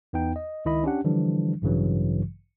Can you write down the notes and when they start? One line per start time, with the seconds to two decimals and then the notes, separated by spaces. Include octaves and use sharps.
0.13 E2 B3 D#4 G5
0.36 D#5
0.65 C#2 D#3 E4 D#5 B5
0.84 C#4 D4 G4 F#5
1.04 D3 E3 F3 G3 D4
1.62 A1 G2 C#3 E3 F#3